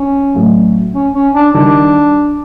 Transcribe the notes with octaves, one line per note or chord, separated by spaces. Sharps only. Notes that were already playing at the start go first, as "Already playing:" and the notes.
Already playing: C#4
A1 A2 F#3
C#4
C#4
D4
D#3 G3 D4